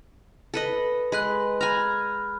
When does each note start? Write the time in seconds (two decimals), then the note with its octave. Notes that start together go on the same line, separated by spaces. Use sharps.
0.54 A4 B4 D#5
1.12 G#3 B4 B5 F#6
1.61 G#5 A#5 B5 F6